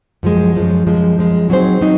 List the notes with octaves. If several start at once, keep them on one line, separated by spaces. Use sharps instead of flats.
F#2 F3 G#3
F#2 F3 G#3
F#2 F3 G#3
F#2 F3 G#3
F#3 C4 D#4 G#4 C5
F#3 C4 D#4